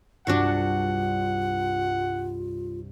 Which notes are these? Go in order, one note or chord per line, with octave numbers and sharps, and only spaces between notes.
C2 G2 D4 F4 F#4 F#5 C#6